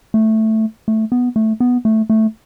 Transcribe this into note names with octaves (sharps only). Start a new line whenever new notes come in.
A3
A3
B3
A3
B3
A3
A3